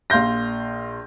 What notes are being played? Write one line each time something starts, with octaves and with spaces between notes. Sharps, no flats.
A#1 F5 C6 G6 A#6